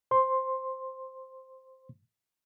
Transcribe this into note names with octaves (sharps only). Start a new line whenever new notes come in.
C5 C6